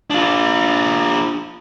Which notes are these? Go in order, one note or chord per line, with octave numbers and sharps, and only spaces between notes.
D4 F4